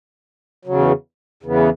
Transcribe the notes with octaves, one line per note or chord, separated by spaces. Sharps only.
E2 C#3 F#3
E2 C#3 E3 B3